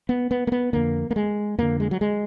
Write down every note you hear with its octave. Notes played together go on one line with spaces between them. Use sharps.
B3
B3
A#3
B3
F2 D3 A#3
A#3
G#3
F2 D3 A#3
G#3
F#3
G#3